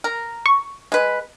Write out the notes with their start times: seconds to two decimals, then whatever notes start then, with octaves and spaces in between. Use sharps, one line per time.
0.04 A#4
0.46 C#6
0.92 G#3 B4